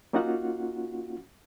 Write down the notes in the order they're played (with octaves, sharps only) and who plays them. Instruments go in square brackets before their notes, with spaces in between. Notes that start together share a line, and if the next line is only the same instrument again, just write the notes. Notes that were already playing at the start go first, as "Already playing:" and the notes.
[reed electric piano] A#3 C#4 D#4 F4 F#4 F#5